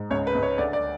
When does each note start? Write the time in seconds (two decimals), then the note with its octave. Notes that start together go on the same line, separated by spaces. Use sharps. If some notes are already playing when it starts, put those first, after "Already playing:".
Already playing: G#2
0.10 C#2 C#5
0.27 B4
0.35 C#2
0.43 C#5
0.58 D2 D5
0.73 D5